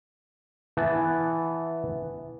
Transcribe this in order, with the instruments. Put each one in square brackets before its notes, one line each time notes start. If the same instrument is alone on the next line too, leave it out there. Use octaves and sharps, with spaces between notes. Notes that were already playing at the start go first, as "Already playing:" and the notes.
[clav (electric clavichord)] E3 B3 A5